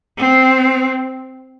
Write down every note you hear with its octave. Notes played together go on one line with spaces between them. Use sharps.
C4